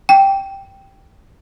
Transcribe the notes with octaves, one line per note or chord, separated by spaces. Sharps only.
G5